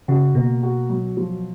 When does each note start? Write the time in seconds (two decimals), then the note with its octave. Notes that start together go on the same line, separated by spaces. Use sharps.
0.08 C#3 F#4
0.35 B2 A#3
0.63 F#4
0.90 F#3
1.17 F3